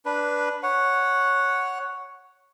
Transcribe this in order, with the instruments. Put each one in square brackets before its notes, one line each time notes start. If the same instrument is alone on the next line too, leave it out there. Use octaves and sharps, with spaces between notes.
[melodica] D4 B4
C#5 F#5